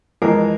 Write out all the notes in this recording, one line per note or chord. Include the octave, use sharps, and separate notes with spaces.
F2 E3 G#3 A#4